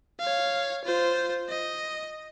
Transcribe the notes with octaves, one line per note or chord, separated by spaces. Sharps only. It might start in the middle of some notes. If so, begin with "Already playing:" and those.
C#5 F5
F4 C5
D#5